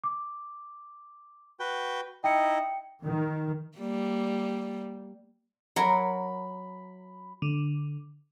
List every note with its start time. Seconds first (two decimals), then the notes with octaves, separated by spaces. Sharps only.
0.04 D6
1.60 F#4 B4 G5
2.24 D#4 E4 D#5 G5 C#7
3.04 D#3
3.78 G3 A#3
5.76 F#3 A#4 B5
7.42 D3